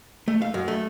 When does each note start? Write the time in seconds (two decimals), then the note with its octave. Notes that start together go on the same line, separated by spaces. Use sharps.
0.28 A3
0.42 F5
0.54 F#2
0.68 A3